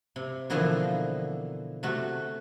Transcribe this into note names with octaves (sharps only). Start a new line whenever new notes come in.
C3
B2 D3 E3 F3 A#3 C4
C3 A3 F#4